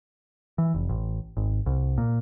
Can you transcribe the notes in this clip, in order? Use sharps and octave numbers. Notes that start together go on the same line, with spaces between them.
E3
F1
A1
G#1
C2
A#2